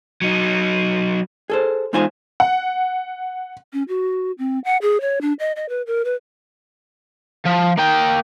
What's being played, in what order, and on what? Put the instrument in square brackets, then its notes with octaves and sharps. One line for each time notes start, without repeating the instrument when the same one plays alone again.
[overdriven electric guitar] F#3 D#4
[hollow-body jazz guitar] G#4 A4 C5
E2 G#3 D#4 F4 C5 G#5
[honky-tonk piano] F#5
[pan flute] C#4
F#4
C4
F#5
G#4
C#5
D4
D#5
D#5
B4
A#4
B4
[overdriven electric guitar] F3
A#3 G5